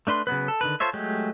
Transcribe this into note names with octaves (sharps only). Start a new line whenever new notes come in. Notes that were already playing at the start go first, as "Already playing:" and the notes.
A3 D4 B4 C6
C#3 F#3 B3 B4
A4
D3 D#3 B4
F4 A4 C5 C#5 E5
F#3 G#3 A3 G4